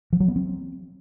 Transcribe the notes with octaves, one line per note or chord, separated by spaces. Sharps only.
F3
F#3
B3
C4